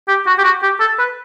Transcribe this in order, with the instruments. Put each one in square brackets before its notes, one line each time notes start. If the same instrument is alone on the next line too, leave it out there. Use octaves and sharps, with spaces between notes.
[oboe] G4
F#4
G4
F#4
G4
A4
B4